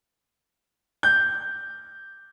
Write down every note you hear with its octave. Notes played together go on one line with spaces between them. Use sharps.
G6